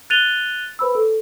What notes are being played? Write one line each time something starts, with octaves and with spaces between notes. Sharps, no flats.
F#6 A6 D#7 F7 G7
B4 C5 B5 E6
A4